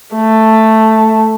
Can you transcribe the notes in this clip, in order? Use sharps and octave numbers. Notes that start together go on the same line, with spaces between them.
A3